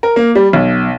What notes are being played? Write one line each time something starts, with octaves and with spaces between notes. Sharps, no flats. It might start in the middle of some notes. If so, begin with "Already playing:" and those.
A#4
A#3
G3
B1